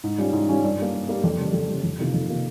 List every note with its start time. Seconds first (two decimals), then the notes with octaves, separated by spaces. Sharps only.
0.04 G#2
0.18 G3 C#4 F4
0.33 G#2
0.49 G3 C#4 F4
0.64 G2
0.78 G3 A#3
0.94 G2
1.09 G3 A#3
1.24 F2
1.38 C#3 G3
1.53 F2
1.68 C#3 G3
1.83 F2
1.99 C3 D#3 A#3 F4
2.13 F2
2.29 C3 D#3 A#3 F4